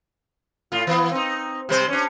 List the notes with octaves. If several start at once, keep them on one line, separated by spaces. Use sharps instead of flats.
A2 F4
E3 B3
C4 D#4
C3 G3 C5
C#4 D4